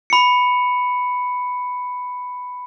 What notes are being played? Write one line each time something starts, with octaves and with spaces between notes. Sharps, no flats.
B5 C#7